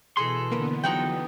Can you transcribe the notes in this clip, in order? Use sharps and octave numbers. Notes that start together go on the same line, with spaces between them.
B2 E3 G#4 A4 C6
D3 A#3 B3 A#4 B4
F2 F#3 G#3 D#4 F#4 G5